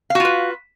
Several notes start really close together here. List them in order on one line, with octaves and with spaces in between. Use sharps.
F5 F#4 F4 B4